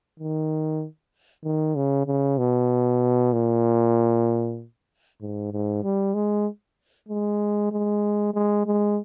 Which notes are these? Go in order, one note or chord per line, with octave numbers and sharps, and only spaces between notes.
D#3
D#3
C#3
C#3
B2
A#2
G#2
G#2
G3
G#3
G#3
G#3
G#3
G#3